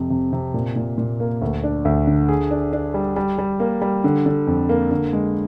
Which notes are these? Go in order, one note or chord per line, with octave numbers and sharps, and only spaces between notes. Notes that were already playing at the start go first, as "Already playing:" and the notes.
Already playing: F2 C3
C3
C3
A#2
A#2
A#2
A#3
D2
D4
D2
D3
G#4
D4
D4
G3
G3
G3
A#3
G3
D3
D3
F2
A#3
D3
G#3